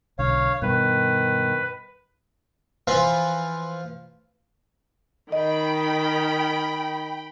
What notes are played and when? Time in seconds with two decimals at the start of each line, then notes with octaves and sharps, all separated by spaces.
0.19 B1 D3 C#5 F5
0.62 G2 B2 D#3 B4
2.87 E3 F3 F4 B4
5.32 D#3 D#5 G5 B5